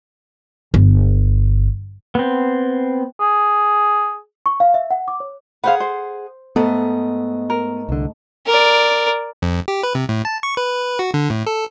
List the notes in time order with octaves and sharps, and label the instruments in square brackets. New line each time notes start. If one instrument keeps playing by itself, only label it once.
[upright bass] G1
[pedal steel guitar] B3 C4
[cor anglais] G#4
[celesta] C#6
F5
E5
F#5
D6
C#5
[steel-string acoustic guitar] G#4 F#5 [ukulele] B4 C5 F5
[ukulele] C5
[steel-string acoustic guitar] G#2 A3 D#5 [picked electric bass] B3
[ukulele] A#4
[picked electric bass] C2 D3
[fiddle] A#4 D5
[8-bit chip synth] F2
G4
B4
C3
A2
A5
C#6
B4
F#4
D3
A2
A4